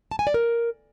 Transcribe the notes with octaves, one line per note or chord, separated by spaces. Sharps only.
A5
G#5
D5
A#4